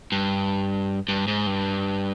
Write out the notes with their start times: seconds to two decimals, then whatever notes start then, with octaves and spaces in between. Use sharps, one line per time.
0.12 G2
1.08 G2
1.28 G#2
1.47 G2